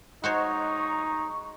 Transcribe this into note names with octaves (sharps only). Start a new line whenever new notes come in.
G#3 D#4 F#4 C5 C#5 A#5 C#6